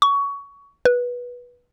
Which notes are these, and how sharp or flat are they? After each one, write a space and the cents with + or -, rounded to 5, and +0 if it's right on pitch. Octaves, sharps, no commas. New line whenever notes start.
C#6 +20
B4 -15